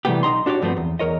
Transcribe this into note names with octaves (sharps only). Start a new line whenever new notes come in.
C3 E3 G3 A3 B3 G4
B1 D#4 A#5 C6
D4 F#4 G4 C#5 D5
G2 F3 A3 B3 C4
E2
E2 A#4 C#5 D#5